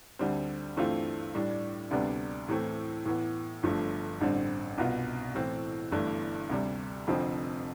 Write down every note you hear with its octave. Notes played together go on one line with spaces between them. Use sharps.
D2 D3 G3 C4
G2 E3 A3 C4 F4
A2 G3 D4
D2 C3 G3 B3 D4
A2 E3 A3 C4
A2 E3 B3
G1 G2 F3 A3
A1 G2 D3 G3 C4
C2 B2 B3 F4
A2 E3 A3 C4
G1 G2 E3 A3 D4
D2 C3 G3
F1 F2 D3 F3 C4